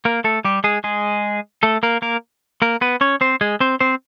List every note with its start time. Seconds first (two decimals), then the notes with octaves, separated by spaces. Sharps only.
0.05 A#3 A#4
0.24 A3 A4
0.45 G3 G4
0.64 G#3 G#4
0.84 G#3 G#4
1.63 A3 A4
1.83 A#3 A#4
2.02 A#3 A#4
2.62 A#3 A#4
2.81 B3 B4
3.01 C#4 C#5
3.21 C4 C5
3.41 G#3 G#4
3.60 C4 C5
3.80 C4 C5